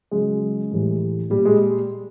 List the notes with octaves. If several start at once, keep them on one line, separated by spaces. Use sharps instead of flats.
C#3 F#3 G#3
A2 E3 G3
A#2 G3
G#3